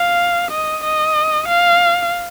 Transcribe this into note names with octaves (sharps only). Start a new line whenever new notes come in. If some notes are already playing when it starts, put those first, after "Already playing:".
Already playing: F5
D#5
D#5
F5